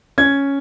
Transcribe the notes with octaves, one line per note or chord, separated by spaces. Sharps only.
C#4 G#6